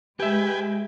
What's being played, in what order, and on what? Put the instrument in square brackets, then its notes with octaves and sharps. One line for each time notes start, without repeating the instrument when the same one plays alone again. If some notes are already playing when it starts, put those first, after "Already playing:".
[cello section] G#3 [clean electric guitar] G4 E5 [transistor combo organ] B4 G5 G#5